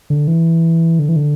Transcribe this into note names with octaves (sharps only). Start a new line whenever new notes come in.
D3
E3
D3
E3
D3